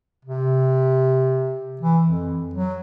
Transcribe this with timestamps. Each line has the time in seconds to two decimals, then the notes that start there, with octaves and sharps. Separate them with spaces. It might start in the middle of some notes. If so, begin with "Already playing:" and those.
0.25 C3
1.81 E3
2.05 F2
2.54 F#3